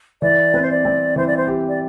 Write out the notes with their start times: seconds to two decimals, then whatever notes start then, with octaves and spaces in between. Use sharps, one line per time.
0.22 E3 D5
0.53 C4 B4
0.61 C5
0.69 D5
0.85 C4
1.16 E3 C5
1.27 D5
1.37 C5
1.47 G4
1.68 D5